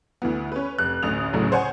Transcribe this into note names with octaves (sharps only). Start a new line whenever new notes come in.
D2 E3 B3
C#4 B4
F1 F#6
A1 D2 D#6 F7
A1 D2 A2 C#3 F#3
C5 C#5 F#5 G#5